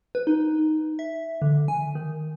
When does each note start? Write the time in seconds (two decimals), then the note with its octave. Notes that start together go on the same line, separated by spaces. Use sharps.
0.15 B4
0.27 D#4
0.99 E5
1.42 D3
1.68 G#5
1.95 D#3